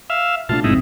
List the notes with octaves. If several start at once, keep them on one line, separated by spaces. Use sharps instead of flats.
E5 F5
B2 A3 D4 F4 A5
F1 A#1 G#2 C4 D#4 E4